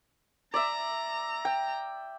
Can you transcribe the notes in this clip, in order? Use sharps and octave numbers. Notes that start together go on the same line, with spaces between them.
D5 E5 A#5
G5